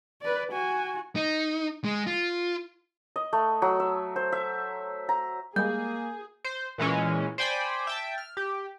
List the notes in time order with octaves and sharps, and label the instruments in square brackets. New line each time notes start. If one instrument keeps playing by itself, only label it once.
[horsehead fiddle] B4 D5
F#4 G#5
[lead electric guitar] D#4
G#3
F4
[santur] D#5
A3
F#3
E5
C5
E5
A#5
[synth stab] G3 G#3 [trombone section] A#3 [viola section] G#4 [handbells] G6
[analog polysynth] C5
A#2 E3 G#3 C#4
C5 D5 G5 G#5 B5
E5 G5 A5
F6
G4